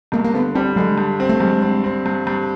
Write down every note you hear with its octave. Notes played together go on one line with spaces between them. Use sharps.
G2 G#3 A#3
A#3
D3 A3 B3
G3 C4 D4
D3 F#3 G#3
G2
C4
A3
G2 F#3 G#3
C4
C4
G2
G2